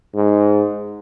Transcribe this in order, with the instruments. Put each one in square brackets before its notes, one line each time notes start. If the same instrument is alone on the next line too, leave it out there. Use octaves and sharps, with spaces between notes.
[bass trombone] G#2